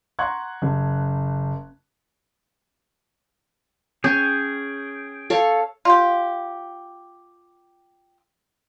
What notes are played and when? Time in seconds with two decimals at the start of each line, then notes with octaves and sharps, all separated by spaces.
0.19 F#5 A#5 C6 C#6 F#6 G#6
0.62 F#1
4.04 C#4 G#4 G5
5.30 A4 C#5 F5
5.85 F4 G4